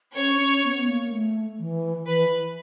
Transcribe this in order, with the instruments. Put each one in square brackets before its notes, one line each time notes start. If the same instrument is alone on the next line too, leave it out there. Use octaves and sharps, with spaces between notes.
[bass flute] C#4 [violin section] C#5
[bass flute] C#4
B3
A#3
A3
E3
[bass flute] E3 [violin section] B4